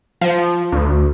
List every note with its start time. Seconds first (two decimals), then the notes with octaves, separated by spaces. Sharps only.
0.21 F3
0.72 D2